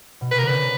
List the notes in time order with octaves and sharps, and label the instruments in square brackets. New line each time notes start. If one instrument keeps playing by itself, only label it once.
[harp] B2
[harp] C3 [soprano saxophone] B4
[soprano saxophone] A#4
[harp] D3
[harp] C#3 [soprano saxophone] B4